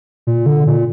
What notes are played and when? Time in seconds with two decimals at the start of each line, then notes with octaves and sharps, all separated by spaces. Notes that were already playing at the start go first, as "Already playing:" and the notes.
0.27 A#2
0.46 D3
0.67 A#2